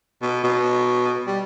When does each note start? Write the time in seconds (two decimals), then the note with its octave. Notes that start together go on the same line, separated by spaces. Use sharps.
0.22 B2
0.44 B2
1.27 G3